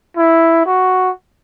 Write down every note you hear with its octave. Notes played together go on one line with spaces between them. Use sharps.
E4
F#4